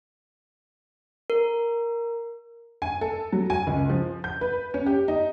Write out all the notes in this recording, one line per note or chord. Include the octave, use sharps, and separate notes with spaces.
A#4
G#5
A4
F#3
G#5
C#2
F3
G6
B4
C#4
G4
D#4